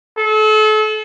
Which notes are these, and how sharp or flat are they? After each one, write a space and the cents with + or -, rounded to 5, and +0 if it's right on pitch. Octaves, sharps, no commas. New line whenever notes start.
A4 -35